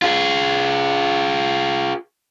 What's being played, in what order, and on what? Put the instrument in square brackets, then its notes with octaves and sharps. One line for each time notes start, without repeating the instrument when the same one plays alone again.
[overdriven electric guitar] F4 G#4